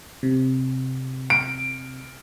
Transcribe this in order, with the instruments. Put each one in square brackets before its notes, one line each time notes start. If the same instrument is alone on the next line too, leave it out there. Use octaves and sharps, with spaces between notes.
[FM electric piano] C3
[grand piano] D7